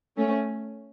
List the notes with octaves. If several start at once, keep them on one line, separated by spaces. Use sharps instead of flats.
A3 C#4